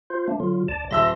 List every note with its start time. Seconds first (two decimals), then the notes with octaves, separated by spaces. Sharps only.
0.10 F4 C5
0.28 A3 A#3 D4
0.40 D3 F#3 F4
0.68 D2 D5 A5
0.91 D#1 E5 C6 E6 A#6